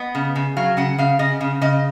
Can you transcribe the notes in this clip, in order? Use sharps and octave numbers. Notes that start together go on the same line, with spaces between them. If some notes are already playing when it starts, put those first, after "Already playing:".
Already playing: B3 D#5
C#3
C#3
F#3 F5
C#3 F#5
C#3 F5
C#3 D#5
C#3
C#3 D#5